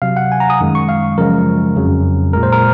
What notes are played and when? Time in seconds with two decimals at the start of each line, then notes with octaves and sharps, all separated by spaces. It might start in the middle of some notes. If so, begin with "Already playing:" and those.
0.02 C3 F#3 F5
0.17 F#5
0.32 G#5
0.40 A#5
0.50 D#6
0.61 F#2 D#3 G#3
0.75 C#6
0.89 F5
1.18 F#2 C#3 F3 G#3 A#4
1.76 F2 C#3 F#3
2.33 A#2 G#3 A#4
2.43 C5
2.52 A#4